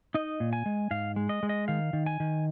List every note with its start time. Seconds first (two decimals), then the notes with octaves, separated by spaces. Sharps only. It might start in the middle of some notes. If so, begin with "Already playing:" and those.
0.14 D#4 D#5
0.40 A#2
0.53 G#5
0.66 G#3
0.91 G#2 F5
1.16 G#3
1.29 D#5
1.43 G#3
1.49 D#5
1.68 D#3 F5
1.93 D#3
2.06 G#5
2.20 D#3